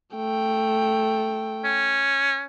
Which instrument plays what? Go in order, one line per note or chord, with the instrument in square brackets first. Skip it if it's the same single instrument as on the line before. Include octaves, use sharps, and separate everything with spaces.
[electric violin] A3 G5
[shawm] C#4